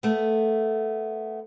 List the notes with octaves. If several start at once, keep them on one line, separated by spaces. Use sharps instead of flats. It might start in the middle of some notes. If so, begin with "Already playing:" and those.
A3 B3